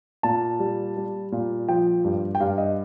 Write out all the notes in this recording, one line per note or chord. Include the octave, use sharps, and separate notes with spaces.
A#2 A5
G3
G3
A#2
F3 G5
G2
G5
G2 F5
D#5